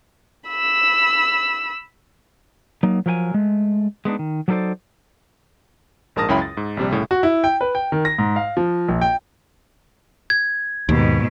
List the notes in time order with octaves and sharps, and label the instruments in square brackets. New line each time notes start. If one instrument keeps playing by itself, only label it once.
[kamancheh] B5 E6
[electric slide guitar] F#3 A#3 D#4
F3 F#3 A#4 G5 G#5
G#3 A3
G#3 B3 D4 D#4
D#3
F#3 D4 D#4 A4 C5 D5
[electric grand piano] A#1 G#2 A#4 A5 D#6 A#6
C#2 F#2 C#4 E4 G5 B5
A6
G#2
A#1 C3 G3
C2 A2 C#3
[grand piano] F#4
E4
G5
B4
G5
D#3
A#6
G#2
F5
F3
A#1
G5
[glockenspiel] G#6
[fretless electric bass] D#2 [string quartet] G#2 B2